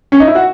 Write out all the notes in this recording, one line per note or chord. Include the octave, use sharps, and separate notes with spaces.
C#4
D#4
E4
F#4